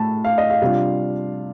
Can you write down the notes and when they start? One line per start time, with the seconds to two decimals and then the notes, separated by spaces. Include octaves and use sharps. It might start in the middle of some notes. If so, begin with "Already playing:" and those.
Already playing: A2 A5
0.24 F5
0.38 D#5
0.50 F5
0.62 C3 G3 D4 F4